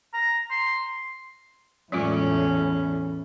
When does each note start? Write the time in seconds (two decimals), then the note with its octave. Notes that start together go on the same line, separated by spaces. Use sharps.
0.14 A#5
0.51 C6
1.92 E2 A2 F#3 G#3 C#4 F4